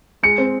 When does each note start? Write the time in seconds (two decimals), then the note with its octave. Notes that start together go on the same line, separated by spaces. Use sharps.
0.23 G#3 C#7
0.38 C4